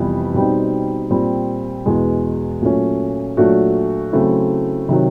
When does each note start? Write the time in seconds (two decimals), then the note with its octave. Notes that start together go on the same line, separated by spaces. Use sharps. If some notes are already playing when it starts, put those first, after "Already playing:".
Already playing: F2 C3 E3 G3 B3
0.34 B2 G3 C4 D#4
1.10 A#2 G3 C4
1.86 E2 B2 G#3
2.62 A#2 F#3 A3 C#4
3.37 A#2 F#3 A3 D4 F#4
4.13 C#3 F#3 A3 C4 E4
4.89 C3 D#3 F#3